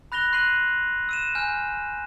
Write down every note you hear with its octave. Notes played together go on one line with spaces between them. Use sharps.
B5 F#6 A#6 F7 G7
C6 F#6 C7 D#7 F#7
E6 D#7 E7
G#5 F6 G6